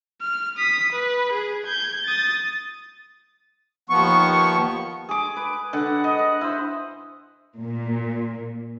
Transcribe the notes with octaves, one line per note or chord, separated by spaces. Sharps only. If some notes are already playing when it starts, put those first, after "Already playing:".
F6
D#6 B6
B4
G#4
G6 G#6
D#6 A6
D#2 F3 B3 C#6
G#4 D6
B4
D3 F#5
D#5
F#5
E4 C5
A#2